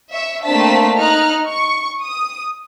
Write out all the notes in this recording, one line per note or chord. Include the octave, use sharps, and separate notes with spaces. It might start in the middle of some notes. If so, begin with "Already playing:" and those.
E5 C#6
A3 A#3 C4 D4 A5 B6
D#4 A#5 F6 F#6
C#6
D#6